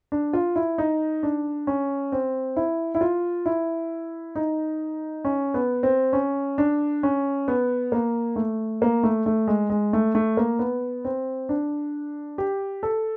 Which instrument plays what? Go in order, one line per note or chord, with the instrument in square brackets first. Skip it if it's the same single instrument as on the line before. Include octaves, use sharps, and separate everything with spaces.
[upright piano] D4
F4
E4
D#4
D4
C#4
C4
E4
E4
F4
E4
D#4
C#4
B3
C4
C#4
D4
C#4
B3
A#3
A3
A#3
A3
A3
G#3
G#3
A3
A3
A#3
B3
C4
D4
G4
A4